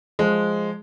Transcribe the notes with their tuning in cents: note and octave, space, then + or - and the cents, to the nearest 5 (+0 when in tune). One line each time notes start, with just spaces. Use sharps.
F3 +0 G#3 +0